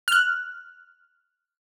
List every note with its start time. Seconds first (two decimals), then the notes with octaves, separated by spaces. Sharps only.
0.08 F6 F#6